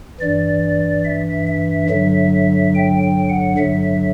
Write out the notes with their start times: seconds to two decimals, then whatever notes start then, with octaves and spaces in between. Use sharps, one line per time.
0.20 G2 E3 D5
1.05 E5
1.47 E5
1.89 G2 D3 F#3 E5
2.74 G5
3.03 G5
3.30 F#5
3.58 G2 D3 F#3 E5